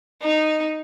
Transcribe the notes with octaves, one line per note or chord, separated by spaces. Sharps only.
D#4